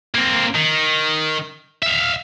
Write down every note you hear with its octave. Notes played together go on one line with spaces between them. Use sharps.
A#3 C4
D#3
E5 F5